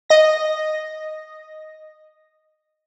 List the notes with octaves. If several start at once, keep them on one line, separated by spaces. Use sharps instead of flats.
D#5 A#6